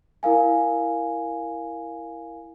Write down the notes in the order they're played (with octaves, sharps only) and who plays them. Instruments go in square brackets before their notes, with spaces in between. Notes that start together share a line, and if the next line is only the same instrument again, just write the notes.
[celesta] E4 A#4 F5 G#5